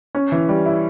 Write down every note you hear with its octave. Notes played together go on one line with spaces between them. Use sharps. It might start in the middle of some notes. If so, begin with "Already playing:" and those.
C#4
E3
G3
E4